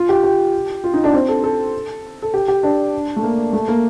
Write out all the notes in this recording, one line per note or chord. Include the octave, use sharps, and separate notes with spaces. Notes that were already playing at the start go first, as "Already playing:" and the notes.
Already playing: F4
G4
G4
F4
D#4
D4
C4
A4
A4
A4
G4
G4
D4
A3
A#3
A3
A#3